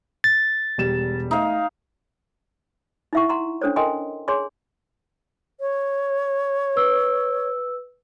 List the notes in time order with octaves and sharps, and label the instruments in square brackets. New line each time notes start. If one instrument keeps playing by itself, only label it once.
[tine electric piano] A6
[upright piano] E1 G3 E7
[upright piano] A3 [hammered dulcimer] D#4 F5
[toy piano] D#4 E4 E5 F#5 C#6
F#5 A#5 C6
C#4 D4 A4 C5 C#5
A4 A#4 D#5 G5 G#5 C6
G#4 C#5 G#5 C6
[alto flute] C#5
[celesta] B4 E6